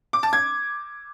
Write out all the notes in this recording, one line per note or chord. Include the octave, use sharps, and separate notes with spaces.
D6
A5
G#6